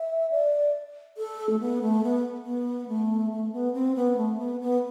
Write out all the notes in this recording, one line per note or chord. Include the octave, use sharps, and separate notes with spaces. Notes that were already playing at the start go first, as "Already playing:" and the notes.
Already playing: E5
D5
A4
A3
B3
A3
B3
B3
A3
A3
B3
C4
B3
A3
B3
B3